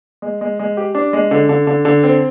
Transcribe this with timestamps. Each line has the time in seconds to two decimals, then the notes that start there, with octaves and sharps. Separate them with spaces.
0.22 G#3
0.41 G#3
0.59 G#3
0.77 G4
0.95 D4
1.13 G#3
1.31 D3
1.49 D3
1.67 D3
1.85 D3
2.03 C4